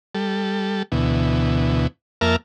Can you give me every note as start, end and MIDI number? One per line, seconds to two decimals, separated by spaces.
0.15 0.83 55
0.15 0.83 69
0.92 1.87 38
0.92 1.87 47
0.92 1.87 52
2.21 2.36 41
2.21 2.36 58
2.21 2.36 70
2.21 2.36 76
2.21 2.36 81
2.21 2.36 89